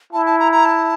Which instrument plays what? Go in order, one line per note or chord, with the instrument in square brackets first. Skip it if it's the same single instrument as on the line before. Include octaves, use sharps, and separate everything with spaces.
[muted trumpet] E4 [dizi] A5
[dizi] A5
A#5
A#5
A5